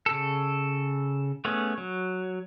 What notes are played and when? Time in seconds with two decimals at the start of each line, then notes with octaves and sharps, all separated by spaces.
0.06 C#3 A4
1.45 A3 B3 C#4 G#4
1.78 F#3